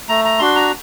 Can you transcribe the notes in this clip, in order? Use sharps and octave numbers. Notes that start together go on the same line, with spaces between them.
A3 A#5
A#5
D4 F#4 C6
A#5